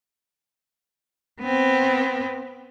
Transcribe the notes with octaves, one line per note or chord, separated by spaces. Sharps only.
B3 C4